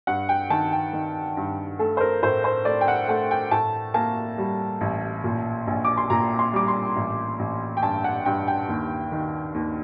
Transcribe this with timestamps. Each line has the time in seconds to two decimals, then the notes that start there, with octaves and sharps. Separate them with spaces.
0.07 G2 F#5
0.29 G5
0.50 D#3 A5
0.72 G5
0.93 D#3
1.37 G2
1.79 A3 A4
1.97 C5
2.01 A#4
2.22 A2 C5
2.44 C5
2.65 A3 D5
2.81 G5
2.88 F#5
3.08 A3 F#5
3.31 G5
3.51 A2 A5
3.94 A#3 A5
4.38 G3
4.81 A1
5.24 A#2
5.67 A#1
5.85 D6
5.98 C6
6.10 A#2 A#5
6.39 C6
6.53 G3 D6
6.68 C6
6.96 A1
7.39 A1
7.77 G5
7.82 G2 A5
8.04 F#5
8.25 G2 G5
8.48 G5
8.69 D#2
9.12 D#3
9.54 D#2